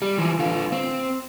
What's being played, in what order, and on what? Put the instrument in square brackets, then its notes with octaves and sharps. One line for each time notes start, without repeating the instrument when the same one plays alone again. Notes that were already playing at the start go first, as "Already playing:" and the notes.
[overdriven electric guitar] G3
E3 F3
D3 F4
C4